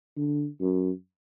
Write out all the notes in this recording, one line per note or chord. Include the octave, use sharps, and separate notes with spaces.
D3
F#2